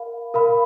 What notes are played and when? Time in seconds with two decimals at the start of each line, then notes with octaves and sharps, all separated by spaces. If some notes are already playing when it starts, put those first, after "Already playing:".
Already playing: A#4 F5 B5
0.34 A#4 F5 B5